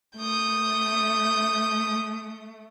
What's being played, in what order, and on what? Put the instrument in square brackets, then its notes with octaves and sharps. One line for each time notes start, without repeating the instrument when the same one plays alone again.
[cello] A3 [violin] D#6 G6